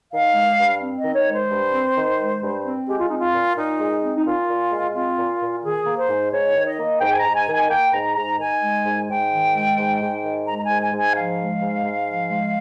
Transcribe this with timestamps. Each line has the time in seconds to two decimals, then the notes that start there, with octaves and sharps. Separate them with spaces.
0.11 D#3 F5
0.34 G#3
0.58 G2
0.80 C4
0.98 D#5
1.03 D#3
1.15 C#5
1.26 G#3
1.32 C5
1.49 G2
1.72 C4
1.96 D#3
2.19 G#3
2.41 G2
2.65 C4
2.87 G#3 G4
2.98 F4
3.08 C4 D#4
3.18 F4
3.33 A#2
3.56 A#2 D#4
3.80 G#3
4.02 C4
4.17 D#4
4.25 A#2 F4
4.48 A#2
4.71 G#3
4.94 C4 F4
5.17 A#2
5.41 A#2
5.63 D#3 G#4
5.86 A#3
5.98 C5
6.09 G#2
6.32 G#2 C#5
6.55 D#3
6.67 D#5
6.79 A#3
7.01 G#2 G5
7.12 G#5
7.19 A#5
7.24 G#2
7.36 G#5
7.47 D#3
7.53 G#5
7.70 A#3 G5
7.93 G#2 A#5
8.15 G#2 A#5
8.38 D#3 G#5
8.61 G#3
8.84 G#2
9.09 G#2 G5
9.30 D#3
9.54 G#3
9.77 G#2
10.00 G#2
10.23 D#3
10.46 G#3 A#5
10.58 A#5
10.63 G#5
10.69 G#2
10.81 G#5
10.92 G#2
10.97 G#5
11.15 F3 F5
11.37 G#3
11.61 G#2
11.84 G#2
12.07 F3
12.30 G#3